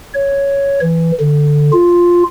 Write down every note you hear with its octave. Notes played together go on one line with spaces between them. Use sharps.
C#5
E3
D3
F4